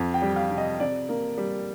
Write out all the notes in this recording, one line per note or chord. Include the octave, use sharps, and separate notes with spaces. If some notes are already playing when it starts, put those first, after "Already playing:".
Already playing: F2
G5
G3
F5
C3
D#5
C3 D5
A#3
G3